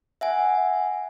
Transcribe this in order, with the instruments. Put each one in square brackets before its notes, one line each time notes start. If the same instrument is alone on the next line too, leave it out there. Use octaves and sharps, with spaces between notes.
[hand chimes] E5 F#5 G#5